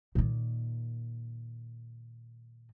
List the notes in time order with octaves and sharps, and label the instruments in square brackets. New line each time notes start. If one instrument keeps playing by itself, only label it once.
[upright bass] A#2 D#3